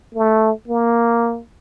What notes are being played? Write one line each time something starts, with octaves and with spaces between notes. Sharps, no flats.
A3
A#3